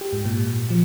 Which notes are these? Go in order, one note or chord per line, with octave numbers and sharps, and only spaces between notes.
G4
G#2
A#2
F3